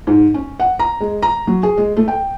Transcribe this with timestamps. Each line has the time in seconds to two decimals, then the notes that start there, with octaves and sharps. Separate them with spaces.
0.07 G#2
0.34 C#4
0.60 F#5
0.79 A#5
1.01 G#3
1.22 A#5
1.47 F#3
1.63 G#4
1.77 G#3
1.97 A3
2.08 G5